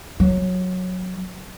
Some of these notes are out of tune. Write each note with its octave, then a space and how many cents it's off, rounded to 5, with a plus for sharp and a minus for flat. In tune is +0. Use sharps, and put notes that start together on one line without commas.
F#3 -10